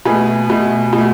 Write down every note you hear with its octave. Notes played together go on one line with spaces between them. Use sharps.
B2 A3 G#4 B4
B2 A3
B2
A3